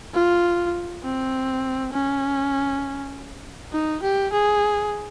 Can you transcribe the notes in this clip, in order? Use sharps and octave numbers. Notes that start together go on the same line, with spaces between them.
F4
C4
C#4
D#4
G4
G#4